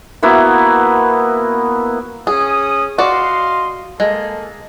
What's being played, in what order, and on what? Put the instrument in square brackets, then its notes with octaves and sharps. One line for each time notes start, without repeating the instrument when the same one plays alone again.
[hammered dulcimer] A#3 B3 E4 F#4
[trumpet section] C#4 D#6 [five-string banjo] G#4
[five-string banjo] F#4 D5 [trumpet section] D#5 F5 C6
[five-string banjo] G#3 [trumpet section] A#3 G#4 A4